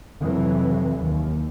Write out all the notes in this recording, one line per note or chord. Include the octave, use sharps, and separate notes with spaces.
F2 C3 E3 F#3
D#2